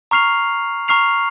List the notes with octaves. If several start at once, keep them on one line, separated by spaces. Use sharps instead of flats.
A#5 C#6 F6 C7 F7
A#5 C#6 F6 C7 F7